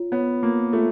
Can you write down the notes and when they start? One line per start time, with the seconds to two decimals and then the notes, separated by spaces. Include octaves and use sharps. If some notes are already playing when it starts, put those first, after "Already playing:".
Already playing: F4 C#5
0.12 B3 C#5
0.42 A#3 F4
0.73 A3 F4